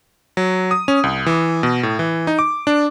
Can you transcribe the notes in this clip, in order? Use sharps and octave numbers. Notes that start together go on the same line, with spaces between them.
F#3
D#6
C#4
C2
E3
B2
A2
E3
D#4
D6
D4